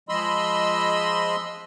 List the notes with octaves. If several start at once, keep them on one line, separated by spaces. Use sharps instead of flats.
F3 G#3 D#5 B5 C6 E6